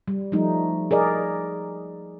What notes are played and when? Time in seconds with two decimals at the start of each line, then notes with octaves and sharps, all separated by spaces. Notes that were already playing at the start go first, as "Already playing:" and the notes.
0.08 G3
0.32 F3 G3 A3 D#4
0.91 G#4 A#4 D5 D#5